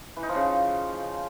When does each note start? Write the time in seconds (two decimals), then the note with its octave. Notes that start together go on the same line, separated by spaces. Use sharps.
0.16 E3
0.23 D#4
0.29 F3
0.35 C#3